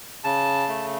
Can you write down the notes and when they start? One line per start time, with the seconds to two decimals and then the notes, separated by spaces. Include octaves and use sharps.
0.24 C#3 A5
0.68 A3